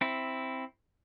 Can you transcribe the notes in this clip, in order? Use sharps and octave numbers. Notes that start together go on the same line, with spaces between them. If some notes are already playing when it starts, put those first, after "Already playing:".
C4 E4